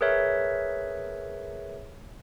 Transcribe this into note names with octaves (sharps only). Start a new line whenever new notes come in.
G#4 A#4 B4 C#5 E5